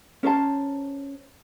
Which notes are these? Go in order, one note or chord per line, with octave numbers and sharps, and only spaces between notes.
C#4 A#4 C5 A5